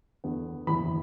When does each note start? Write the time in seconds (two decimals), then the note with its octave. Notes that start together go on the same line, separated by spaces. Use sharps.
0.24 E2 D3 B3
0.67 F#1 E2 E3 B5